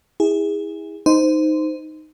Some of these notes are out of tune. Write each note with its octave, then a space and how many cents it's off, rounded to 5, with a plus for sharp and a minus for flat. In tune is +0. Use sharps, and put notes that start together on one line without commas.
E4 -30 G#4 -25
D#4 +0 C5 -15